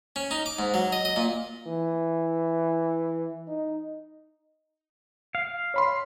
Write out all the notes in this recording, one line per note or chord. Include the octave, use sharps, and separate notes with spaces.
C#4
D#4
D6
G#2
F#3
D#5
D#5
A#2
E3
D#4
F5
C#5 B5 C6